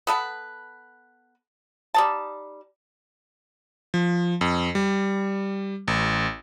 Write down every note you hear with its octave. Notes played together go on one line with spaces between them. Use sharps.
B3 A4 B4
G3 D#4 A5
F3
F2
G3
A1